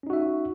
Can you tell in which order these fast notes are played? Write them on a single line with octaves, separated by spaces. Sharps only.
C#4 D#4 F#4 E5